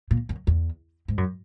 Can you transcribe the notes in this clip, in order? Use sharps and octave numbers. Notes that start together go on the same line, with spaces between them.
A#2
F#2
E2
G#2
F#2